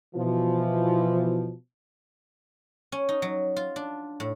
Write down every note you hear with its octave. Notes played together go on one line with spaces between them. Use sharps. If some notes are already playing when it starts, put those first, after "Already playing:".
B2 E3 F3
C#4
D#4
F#3
F4
D4
A2